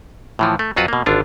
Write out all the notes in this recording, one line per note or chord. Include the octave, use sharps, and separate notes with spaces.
A2 E3 F3
A3
F2 F#3 F4 F#4 B4
B2 A#3
G#1 D3 D4 F4